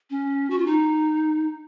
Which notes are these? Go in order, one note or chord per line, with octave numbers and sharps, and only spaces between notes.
C#4
F#4
F4
D#4